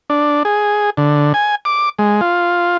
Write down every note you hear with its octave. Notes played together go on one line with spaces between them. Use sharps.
D4
G#4
D3
G#5
D6
G#3
F4